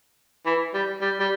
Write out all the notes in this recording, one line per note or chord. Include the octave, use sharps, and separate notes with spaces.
E3
G3
G3
G3